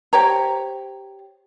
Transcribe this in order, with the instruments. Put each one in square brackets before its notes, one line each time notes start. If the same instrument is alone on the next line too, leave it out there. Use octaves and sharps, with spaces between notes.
[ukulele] G4 C5 C#5 A#5